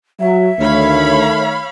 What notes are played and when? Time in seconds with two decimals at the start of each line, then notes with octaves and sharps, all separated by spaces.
0.20 F#3 E5
0.60 D2 D#3 A3 C#5 F5 B5